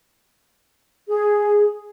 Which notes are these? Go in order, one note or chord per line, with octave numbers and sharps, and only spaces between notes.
G#4